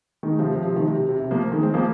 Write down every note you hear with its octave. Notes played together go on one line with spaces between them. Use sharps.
D#3 G#3
C3 F3
C3 F3
C3 F3
D#3
C3
C3
C3
C3
F3 A#3
D#3 G#3
G#3 C4
F3 A#3